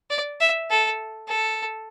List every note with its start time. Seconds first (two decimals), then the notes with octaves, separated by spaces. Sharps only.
0.10 D5
0.41 E5
0.70 A4
1.28 A4